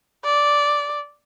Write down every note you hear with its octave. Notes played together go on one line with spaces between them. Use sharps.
D5